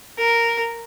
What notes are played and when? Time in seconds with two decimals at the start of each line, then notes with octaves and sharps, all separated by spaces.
0.18 A#4